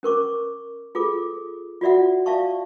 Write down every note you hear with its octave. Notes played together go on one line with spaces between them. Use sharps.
C#4 A#4 C#6 D6
F4 G#4 A4 D6
F4 F#4 D5 E5 F#5
D5 E5 F5 A5 C#6